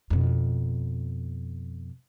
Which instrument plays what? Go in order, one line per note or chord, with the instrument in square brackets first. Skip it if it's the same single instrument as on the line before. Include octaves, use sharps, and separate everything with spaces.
[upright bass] F2 B2